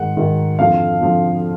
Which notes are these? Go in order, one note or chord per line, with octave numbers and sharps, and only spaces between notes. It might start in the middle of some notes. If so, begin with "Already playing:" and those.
Already playing: G#2 D#3 F#5
G#2 D#3
F2 D3 F3 F5
F2 D3 F3